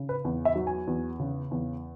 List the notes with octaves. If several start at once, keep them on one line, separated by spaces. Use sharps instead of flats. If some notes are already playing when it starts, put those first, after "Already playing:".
Already playing: C#3
B4
E2
E5
F#3
G#5
E2
C#3
E2